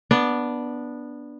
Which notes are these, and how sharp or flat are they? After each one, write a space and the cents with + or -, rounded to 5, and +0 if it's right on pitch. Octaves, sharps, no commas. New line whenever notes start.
B3 -15 D4 +0